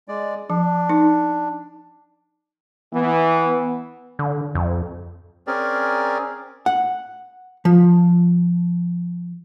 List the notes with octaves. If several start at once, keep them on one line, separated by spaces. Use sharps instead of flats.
G#3 D5
F3 D4
D#4
E3 B3
D3
F2
C4 C#4 G#4 A#4 D5
F#5
F3